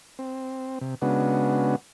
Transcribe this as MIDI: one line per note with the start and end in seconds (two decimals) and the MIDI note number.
0.19 0.79 60
0.81 0.95 48
1.02 1.76 49
1.02 1.76 56
1.02 1.76 59
1.02 1.76 62
1.02 1.76 66